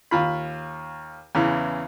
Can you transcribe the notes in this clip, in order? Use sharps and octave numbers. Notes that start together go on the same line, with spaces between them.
D#2 F4 B5
E2 C#3 E3